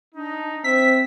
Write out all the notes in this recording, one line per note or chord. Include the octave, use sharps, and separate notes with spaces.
D4 D#4
C4 C5 E5 B6